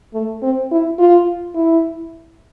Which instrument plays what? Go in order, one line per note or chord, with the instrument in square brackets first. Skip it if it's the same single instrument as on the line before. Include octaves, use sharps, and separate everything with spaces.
[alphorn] A3
C4
E4
F4
E4